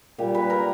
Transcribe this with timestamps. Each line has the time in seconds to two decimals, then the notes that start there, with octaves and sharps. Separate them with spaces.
0.18 A#2 G3 G4
0.35 B4
0.50 A#4